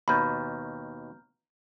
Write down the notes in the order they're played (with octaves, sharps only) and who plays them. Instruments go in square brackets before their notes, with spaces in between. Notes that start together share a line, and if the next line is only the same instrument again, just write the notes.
[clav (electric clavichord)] D#2 B2 [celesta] A#5 F6 G6 [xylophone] B5